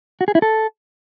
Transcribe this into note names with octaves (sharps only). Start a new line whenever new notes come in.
F#4
G#4
E4
A4